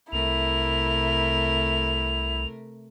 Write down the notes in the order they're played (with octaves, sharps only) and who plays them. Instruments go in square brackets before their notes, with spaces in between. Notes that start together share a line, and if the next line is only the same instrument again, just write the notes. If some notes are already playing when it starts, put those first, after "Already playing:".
[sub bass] C2 [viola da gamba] C3 A3 A#4 [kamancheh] E4 [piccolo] F7